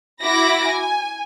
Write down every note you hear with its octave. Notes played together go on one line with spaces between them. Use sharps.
E4 F#4 B5 D6 A#6
G#5